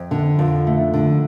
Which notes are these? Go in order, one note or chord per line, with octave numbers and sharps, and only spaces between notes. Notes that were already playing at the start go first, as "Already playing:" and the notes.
Already playing: F2
D3
F2
A3
D3